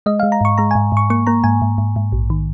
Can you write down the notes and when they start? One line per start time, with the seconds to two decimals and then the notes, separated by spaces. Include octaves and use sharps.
0.06 G#3 D#5
0.20 G#3 F5
0.32 A#5
0.41 G#2 C#6
0.58 G#3 A#5
0.71 G#5
0.75 G#2
0.92 G#2 C#6
1.10 A#3 C#6
1.27 A#3 A#5
1.44 G#2 G#5
1.62 G#2
1.78 G#2
1.96 G#2
2.12 A#1
2.30 D#3